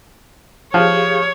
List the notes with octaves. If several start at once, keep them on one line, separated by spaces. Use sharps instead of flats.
F3 G4 G#4 C#5 F5